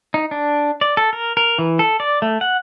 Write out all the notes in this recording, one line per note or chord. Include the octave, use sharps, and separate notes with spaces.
D#4
D4
D5
A4
A#4
A#4
E3
A4
D5
A3
F#5